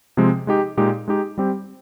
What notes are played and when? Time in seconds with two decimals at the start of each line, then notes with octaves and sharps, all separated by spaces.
0.17 C3 F3 G#3 C4
0.47 G#3 D#4 G4
0.77 A#2 G#3 D#4 G4
1.08 G#3 D#4 G4
1.38 G3 C4 G4